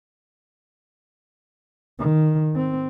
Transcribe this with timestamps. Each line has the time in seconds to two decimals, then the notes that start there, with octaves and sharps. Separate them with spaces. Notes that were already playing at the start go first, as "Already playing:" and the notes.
1.99 D#3
2.55 C4